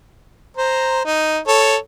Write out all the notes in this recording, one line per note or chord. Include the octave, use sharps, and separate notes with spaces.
C5 A#5
D#4
A4 C#5